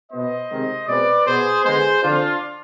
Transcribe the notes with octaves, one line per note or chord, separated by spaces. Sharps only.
B2 B3 C5 D#5
C3 D#3 G#3 C4
B2 G#3 C4 B4 D5
B2 B3 G#4 C5
D3 G#3 B3 G#4 C5
D3 F3 C4 D4 F4